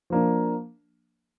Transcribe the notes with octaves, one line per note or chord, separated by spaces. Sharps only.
F3 A#3 D4